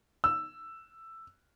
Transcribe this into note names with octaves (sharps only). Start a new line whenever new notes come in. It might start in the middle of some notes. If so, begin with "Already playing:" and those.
E6